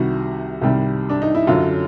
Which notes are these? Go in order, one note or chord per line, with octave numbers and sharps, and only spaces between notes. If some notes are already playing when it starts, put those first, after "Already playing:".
Already playing: C2 C3 D#3 G3 F#4
C2 C3 D#3 G3
D4
D#4
E4
F#2 D3 F#3 F4